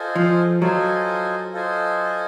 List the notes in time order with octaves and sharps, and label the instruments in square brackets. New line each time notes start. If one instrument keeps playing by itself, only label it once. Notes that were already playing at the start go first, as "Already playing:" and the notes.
Already playing: [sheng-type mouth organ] F4 A4 C5 D#5 G#5
[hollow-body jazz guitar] F3
[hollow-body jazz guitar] F#3 [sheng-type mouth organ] F4 A4 C5 D#5 G#5
[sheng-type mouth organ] F4 A4 C5 D#5 G#5